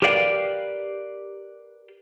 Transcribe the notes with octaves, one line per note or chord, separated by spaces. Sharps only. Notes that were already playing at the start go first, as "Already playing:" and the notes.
G4 A#4 B4 D5 F5 G5